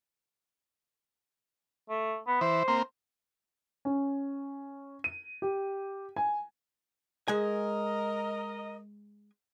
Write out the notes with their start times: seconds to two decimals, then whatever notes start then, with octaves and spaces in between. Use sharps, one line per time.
1.89 A3
2.27 B3
2.41 E3 C5
2.68 A#3 C4
3.85 C#4
5.04 D#7
5.42 G4
6.16 G#5
7.28 G#3 A#4 D#5 G#5